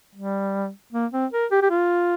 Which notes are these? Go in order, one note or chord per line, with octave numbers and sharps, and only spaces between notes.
G3
A#3
C4
A#4
G4
G4
F4